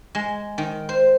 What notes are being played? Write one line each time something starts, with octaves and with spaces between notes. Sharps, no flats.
G#3
D#3
C5